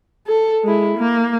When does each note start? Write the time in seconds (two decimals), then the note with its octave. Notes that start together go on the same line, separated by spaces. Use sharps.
0.27 A4
0.64 G#3 E4
0.97 A#3